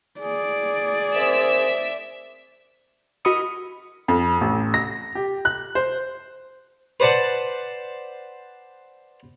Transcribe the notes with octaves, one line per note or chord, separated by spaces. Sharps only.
G#4 D5
C4 A#4 C5 E5 E6
E4 F#4 A#4 D#5 B5 C#7
F2
A1
A#6
G4
F#6
C5
B4 C5 D5 F#5 A5